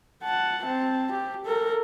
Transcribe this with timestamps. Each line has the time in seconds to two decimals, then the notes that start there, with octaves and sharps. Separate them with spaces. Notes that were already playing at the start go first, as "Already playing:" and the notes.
0.23 F#5 A5
0.63 C4 A5
1.12 G4
1.45 A4 A#4